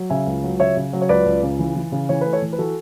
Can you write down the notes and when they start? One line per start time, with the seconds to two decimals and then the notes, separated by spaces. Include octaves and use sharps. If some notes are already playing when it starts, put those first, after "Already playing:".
Already playing: F#3
0.10 C#3 E5 G#5
0.27 C#2
0.44 F#3
0.60 C#3 C#5 E5
0.77 C#3
0.93 F#3
1.02 C#5
1.09 C#2 B4 D5
1.26 C#2
1.43 C#3
1.59 E3
1.76 E3
1.92 C#3
2.09 E3 C#5
2.21 A3 B4
2.33 A4 C#5
2.42 E3
2.53 B4
2.59 E3 F#4 A4